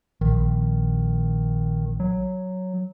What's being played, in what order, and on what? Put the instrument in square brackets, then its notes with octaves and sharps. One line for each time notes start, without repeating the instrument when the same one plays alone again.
[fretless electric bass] A#1 [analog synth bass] D#3
[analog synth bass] F#3